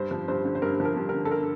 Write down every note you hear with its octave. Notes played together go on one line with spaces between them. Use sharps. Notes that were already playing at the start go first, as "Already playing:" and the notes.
Already playing: G2 C5
F3
G2 C5
D3
C5
G2 A#4
F3
A#4
G2
A#4
D3
A4
A#4